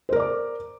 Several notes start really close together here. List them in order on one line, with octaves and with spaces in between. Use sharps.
C5 A#4 D5 D6